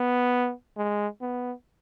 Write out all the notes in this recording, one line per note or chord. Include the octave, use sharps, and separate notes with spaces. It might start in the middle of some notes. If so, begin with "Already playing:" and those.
Already playing: B3
G#3
B3